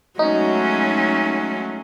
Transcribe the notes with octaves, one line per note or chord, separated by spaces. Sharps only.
F#3 G#3 A3 C#4 D#4